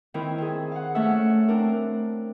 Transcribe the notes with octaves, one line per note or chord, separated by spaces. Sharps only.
D#3 C4 E4 A#4
C4 G#4
F5 F#5
A3 C#4 A4 E5 F#5 E6
C4 D4 A#4